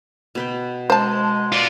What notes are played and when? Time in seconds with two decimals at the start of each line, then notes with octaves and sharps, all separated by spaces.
0.35 B2 B4 G5
0.90 G#3 C5 A5
1.52 F4 D5